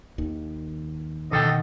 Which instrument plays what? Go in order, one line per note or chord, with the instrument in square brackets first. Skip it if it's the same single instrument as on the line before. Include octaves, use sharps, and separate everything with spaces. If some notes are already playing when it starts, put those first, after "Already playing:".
[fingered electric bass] D#2 D#3
[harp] B2 D#3 A#3 [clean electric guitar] D3 A4 G5 [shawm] D#5